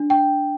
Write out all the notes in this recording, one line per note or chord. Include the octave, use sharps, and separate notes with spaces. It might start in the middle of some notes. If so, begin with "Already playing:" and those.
Already playing: D4
G5